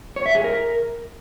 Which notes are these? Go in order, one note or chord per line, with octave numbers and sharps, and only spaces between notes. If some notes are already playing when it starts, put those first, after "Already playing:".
C#5
E5
G#4
A#4